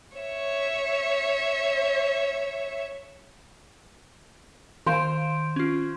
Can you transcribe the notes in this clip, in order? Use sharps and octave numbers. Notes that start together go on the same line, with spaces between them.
C#5 E5
D#3 C5 F5 D7
C#4 F4